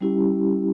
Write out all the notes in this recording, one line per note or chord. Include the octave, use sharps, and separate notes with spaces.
G3 C#4 E4 G4